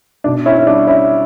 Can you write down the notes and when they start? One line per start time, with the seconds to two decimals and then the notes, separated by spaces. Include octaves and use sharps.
0.24 B2 D4
0.46 C#4 E4
0.59 C#4
0.66 G3 D4
0.87 C#4 E4